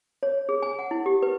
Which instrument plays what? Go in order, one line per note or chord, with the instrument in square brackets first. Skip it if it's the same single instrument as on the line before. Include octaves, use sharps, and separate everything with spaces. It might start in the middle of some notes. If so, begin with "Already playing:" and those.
[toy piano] C#5
G#4
G#5
F#5
E4
G4
B4